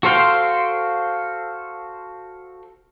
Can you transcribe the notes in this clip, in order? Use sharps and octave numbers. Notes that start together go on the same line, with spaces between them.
F#4 A4 C5 F5 G5